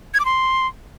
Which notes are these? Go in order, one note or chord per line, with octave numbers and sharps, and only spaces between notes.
G#6
D6
C6